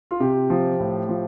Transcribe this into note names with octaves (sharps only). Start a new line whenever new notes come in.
F4
C3 G4
F3
A2
F3